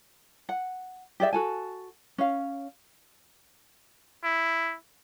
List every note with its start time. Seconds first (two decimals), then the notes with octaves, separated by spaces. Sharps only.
0.49 F#5
1.20 G4 G#4 D5 E5
1.33 F#4 A4 G#5
2.18 C#4 F5
4.24 E4